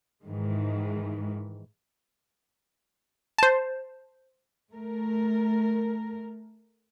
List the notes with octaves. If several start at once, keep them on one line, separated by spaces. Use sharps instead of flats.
G#2 D#3 E3 G#3
C5 A5
A3 A#4